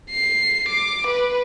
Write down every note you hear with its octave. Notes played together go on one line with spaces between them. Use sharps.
C7
D6
B4